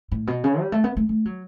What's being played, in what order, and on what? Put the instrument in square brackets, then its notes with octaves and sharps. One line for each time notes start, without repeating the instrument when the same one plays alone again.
[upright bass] A2
B2
C#3
G3
A3
B3
A3
A3
F#3